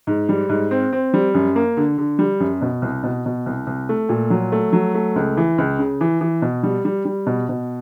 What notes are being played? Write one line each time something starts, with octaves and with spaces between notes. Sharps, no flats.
G#2
G3
G#2
C4
C4
G3
F#2
A#3
D3
D3
G3
F#2
B2
C2
B2
B2
C2
C2
A3
A#2
F#3
A3
F#3
A3
C#2
E3
C#2
C#3
E3
E3
B2
G3
G3
G3
B2
B2